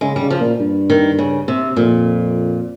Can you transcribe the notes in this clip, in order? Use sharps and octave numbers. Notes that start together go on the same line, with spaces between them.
C#3 G#3
G3
C#3
F3
A#2
G2
D#3
C#3
C3
F2 A#2